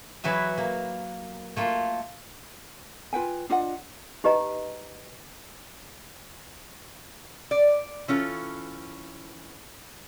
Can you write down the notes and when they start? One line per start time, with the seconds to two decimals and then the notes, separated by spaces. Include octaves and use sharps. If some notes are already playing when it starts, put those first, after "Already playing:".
0.24 E3 F#3 B4 E5
0.58 A#3
1.56 A3 A#3 F4
3.13 F4 B4 G5 G#5
3.49 D4 F4 D#5 F#5
4.24 D#4 G4 B4 D#5 A#5
7.51 D5
8.08 E3 C#4 F4 A4